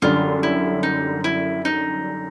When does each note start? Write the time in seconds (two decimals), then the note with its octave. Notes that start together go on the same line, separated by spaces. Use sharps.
0.02 F#2 D3 G3 F4
0.43 E4
0.83 D#4
1.24 E4
1.65 D#4